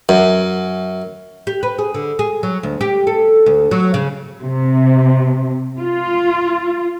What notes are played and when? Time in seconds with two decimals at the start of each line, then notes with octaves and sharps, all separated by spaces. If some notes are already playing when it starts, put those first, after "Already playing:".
0.09 F#2
1.47 G4
1.63 B4
1.78 G#4
1.94 D3
2.19 G#4
2.43 F#3
2.63 D2
2.81 G4
3.07 A4
3.46 D2
3.71 F#3
3.94 C#3
4.42 C3
5.80 F4